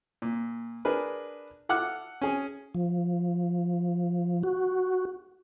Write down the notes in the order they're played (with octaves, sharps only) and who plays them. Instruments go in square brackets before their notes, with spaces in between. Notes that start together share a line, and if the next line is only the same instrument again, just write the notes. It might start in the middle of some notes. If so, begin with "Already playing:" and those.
[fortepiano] A#2
D4 G#4 A#4 B4
A4 F#5 D6 F6 F#6
C#4 G#4
[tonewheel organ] F3
F#4